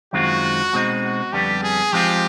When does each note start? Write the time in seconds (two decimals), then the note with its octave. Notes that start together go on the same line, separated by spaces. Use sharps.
0.13 F#2 D#3 G#3 C4 F4 F#4
0.73 B2 G#3 C4 D#4
1.03 F#4
1.32 F2 D3 G3 B3 G4
1.63 G#4
1.92 F3 G#3 C4 F4 G4 G#4